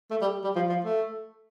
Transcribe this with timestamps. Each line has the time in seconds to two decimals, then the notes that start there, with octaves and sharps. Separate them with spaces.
0.10 A3
0.21 G3
0.44 G3
0.56 F3
0.69 F3
0.84 A3